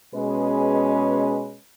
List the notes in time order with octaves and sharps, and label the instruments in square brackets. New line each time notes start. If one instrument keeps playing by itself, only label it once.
[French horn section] B2 G#3 C#4 G#4 B4